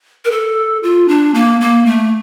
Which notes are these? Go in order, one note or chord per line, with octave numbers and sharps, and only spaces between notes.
A#4
A4
F4
D4
A#3
A#3
A3